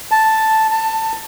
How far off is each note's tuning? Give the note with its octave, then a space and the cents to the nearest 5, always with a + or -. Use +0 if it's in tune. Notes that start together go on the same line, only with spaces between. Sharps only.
A5 +0
A5 +20